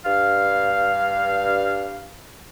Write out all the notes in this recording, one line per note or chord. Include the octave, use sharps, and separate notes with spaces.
G2 F5